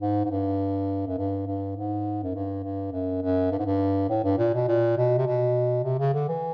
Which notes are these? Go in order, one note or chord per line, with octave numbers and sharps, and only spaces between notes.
G#2
G#2
G2
F#2
G2
G2
G#2
F#2
G2
G2
F#2
F#2
G2
G#2
G2
A2
G2
A#2
B2
A#2
B2
C3
B2
C3
C#3
D3
E3